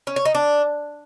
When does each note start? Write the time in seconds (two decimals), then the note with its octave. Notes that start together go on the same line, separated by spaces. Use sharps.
0.07 C#4
0.16 C#5
0.25 D#4
0.35 D4